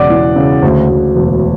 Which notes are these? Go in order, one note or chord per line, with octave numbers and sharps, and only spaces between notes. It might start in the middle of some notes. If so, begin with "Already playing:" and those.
Already playing: E1 C#3 D5 F#5
E3
C#3
D2
D2
E1